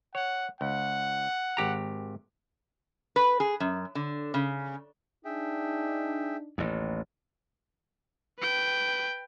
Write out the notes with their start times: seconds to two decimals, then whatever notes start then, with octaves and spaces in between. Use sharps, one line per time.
0.15 C#5 F#5
0.61 C#2 F#5
1.57 G#1 G4 A#5
3.16 B4
3.40 G#4
3.60 F#2
3.95 D3
4.34 C#3
5.25 D4 D#4 G#4 E5 G5
6.58 A1 D#2
8.39 B4 G5